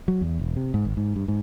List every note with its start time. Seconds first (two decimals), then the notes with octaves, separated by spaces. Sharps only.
0.08 F#3
0.21 E2
0.39 E1
0.56 C3
0.74 G#2
0.85 G#1
0.97 G#2
1.16 G2
1.28 G#2